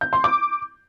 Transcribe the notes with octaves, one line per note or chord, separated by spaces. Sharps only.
G6
C6
D6